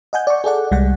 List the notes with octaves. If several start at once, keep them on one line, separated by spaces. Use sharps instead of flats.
D#5 F#5 G#5 G6
D5 C#6
G#4 A4 D5 F#5
C2 G3 G#3 F#5